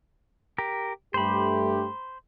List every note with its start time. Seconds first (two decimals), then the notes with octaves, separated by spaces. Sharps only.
0.58 G4 A#4
1.14 G2 A3 G4 C5 B5